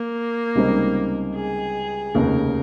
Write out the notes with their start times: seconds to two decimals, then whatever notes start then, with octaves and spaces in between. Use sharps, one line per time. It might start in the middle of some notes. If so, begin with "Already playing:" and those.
Already playing: A#3
0.55 C#2 C3 G3 C4 D#4
1.35 G#4
2.15 F1 D#2 C#3 A#4